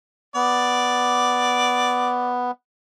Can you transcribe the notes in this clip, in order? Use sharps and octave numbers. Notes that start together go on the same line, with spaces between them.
B3 D5